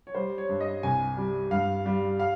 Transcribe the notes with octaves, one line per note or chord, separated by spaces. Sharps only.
C#5
G3 C5
C#5
G2
D#5
C2 G#5
G3
G2 F5
G3
F5